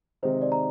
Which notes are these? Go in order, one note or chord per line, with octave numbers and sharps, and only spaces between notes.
C3 D#3 G#3 C4 D#4 C5
D5
A#5